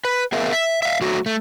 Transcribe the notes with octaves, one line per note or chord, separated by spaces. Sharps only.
B4
B3 G#4 A#4 E5 F5
E5
E5 F5
F#3 A3 F#4
A3